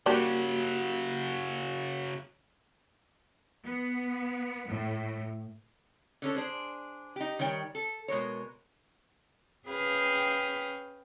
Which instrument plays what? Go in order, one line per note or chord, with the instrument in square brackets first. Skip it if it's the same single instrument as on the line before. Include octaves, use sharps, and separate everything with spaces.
[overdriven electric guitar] C#3 F#3 [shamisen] G3 D4 [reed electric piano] A#3 F#4 G4
[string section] B3
A2
[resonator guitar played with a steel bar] D3 C#4 A4
D4 G#4 C5
D#4 G4
D#3 G3 C#5 G5
A4
B2 G#3 A#4 C#5
[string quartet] C#4 G#4 B4 F5 G5